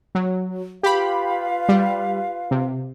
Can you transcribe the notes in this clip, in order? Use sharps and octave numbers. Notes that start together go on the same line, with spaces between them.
F#3
F4 G4 B4 F5 B5
G3
C3